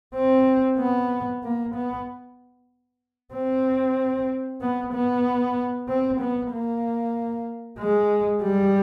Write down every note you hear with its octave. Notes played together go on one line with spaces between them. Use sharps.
C4
B3
A#3
B3
C4
B3
B3
C4
B3
A#3
G#3
G3